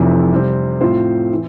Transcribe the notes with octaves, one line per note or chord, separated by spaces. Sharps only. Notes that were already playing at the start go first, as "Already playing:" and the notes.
Already playing: F1 F2 C3 E3
C3 G3 C4
A2 F3 C4 F4 C5
E3